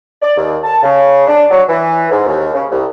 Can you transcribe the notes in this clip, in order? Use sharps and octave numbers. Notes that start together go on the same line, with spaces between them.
D5
D#2
A5
C#3
D4
F#3
E3
G#2
D#2
C#3
C2